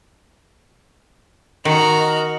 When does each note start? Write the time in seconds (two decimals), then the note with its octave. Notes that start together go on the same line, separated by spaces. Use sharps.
1.65 D#3 F#4 A#4 D#5 A#5